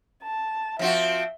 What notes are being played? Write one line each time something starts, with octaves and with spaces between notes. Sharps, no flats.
A5
F3 C4 F#4 E5